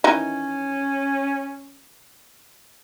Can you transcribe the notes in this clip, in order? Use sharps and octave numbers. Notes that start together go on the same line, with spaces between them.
D#3 E3 C#4 D#4